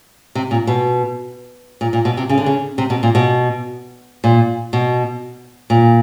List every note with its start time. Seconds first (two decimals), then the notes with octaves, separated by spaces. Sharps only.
0.35 C3
0.51 A#2
0.67 B2
1.81 A#2
1.93 A#2
2.05 B2
2.17 C3
2.29 C#3
2.38 D3
2.46 C#3
2.78 C3
2.90 B2
3.03 A#2
3.15 B2
4.24 A#2
4.73 B2
5.70 A#2